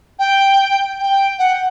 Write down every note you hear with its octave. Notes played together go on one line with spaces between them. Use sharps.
G5
G5
F#5